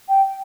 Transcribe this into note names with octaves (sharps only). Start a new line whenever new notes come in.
G5